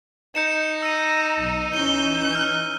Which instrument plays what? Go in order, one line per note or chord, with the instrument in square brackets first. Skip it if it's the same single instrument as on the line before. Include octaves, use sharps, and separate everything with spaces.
[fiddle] D#4 [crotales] G6 C#7 E7
[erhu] A#5 [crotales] E6 D#7
[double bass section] B1
[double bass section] E3 C#4 [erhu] G6 [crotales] D#7 G7
[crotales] F6